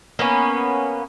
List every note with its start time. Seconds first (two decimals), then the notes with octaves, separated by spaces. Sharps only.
0.19 A#3 B3 C#4